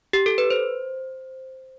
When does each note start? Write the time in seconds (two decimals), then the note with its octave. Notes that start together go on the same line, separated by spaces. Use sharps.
0.13 G4
0.26 A4
0.38 B4
0.50 C5